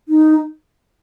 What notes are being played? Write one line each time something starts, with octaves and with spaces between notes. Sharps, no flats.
D#4